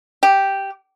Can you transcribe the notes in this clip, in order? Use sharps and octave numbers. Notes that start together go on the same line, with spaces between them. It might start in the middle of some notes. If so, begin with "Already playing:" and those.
G4